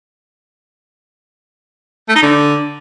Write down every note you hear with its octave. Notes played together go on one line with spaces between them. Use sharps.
A3
D#4
D3